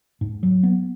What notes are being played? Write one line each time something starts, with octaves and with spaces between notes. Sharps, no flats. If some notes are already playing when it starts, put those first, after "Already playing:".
G#2
F#3
B3